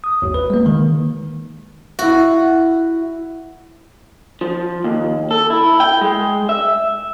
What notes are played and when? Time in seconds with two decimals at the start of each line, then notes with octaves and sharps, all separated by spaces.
0.04 D#6
0.22 G#1 D#2
0.34 B4
0.50 G#3 A#3
0.66 D#3
1.99 E4 F#4 E5
4.41 F3
4.84 D#2
5.31 A4
5.50 E4
5.80 G5
6.01 G#3
6.49 E5